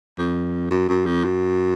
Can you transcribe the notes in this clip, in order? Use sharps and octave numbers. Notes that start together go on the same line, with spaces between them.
F2
F#2
F#2
F2
F#2